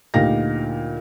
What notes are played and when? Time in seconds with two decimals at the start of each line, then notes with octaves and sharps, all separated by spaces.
0.14 D2 A#2 D#4 G4 F5 A#6